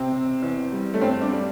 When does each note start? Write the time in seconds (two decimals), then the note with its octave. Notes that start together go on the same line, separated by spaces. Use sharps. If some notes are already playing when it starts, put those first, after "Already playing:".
Already playing: C3 C4
0.12 C3
0.42 E2
0.72 G3
0.94 A3
1.01 G2 C4
1.21 D4
1.31 G3